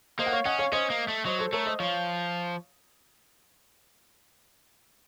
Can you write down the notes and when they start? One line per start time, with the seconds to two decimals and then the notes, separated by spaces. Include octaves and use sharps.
0.19 A#3 C5 D#5
0.26 F#5
0.32 C#5 F5
0.46 C#4 D#5 F#5
0.59 C#5 F5
0.72 C#4 C5 D#5
0.90 A#3
1.08 A3
1.25 F#3 C5 D#5
1.39 A4 C5
1.52 A3 A#4 C#5
1.66 C5 D#5
1.79 F3 C#5 F5